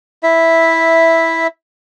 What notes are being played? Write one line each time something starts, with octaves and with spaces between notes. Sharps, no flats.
E4 E5